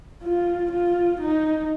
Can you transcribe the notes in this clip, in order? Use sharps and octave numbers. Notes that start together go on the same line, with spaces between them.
F4
F4
D#4